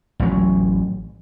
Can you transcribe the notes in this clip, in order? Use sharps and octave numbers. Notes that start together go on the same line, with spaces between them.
A1 F#3